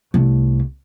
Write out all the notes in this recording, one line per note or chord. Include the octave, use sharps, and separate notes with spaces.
C2 A3